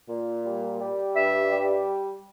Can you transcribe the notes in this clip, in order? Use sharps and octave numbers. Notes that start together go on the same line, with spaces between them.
A#2
G3
G3
G2 E5
G3